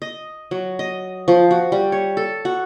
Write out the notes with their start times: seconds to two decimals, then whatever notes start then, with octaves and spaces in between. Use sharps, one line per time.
0.02 D#5
0.51 F#3
0.79 D#5
1.28 F3
1.51 F#4
1.72 G3
1.92 C#5
2.17 A4
2.45 F#4